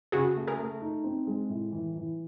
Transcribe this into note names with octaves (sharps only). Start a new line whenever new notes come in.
C#3 F#4 G#4
A3
G#4 A#4
A3
D#4
C4
G#3
A2
E3
E3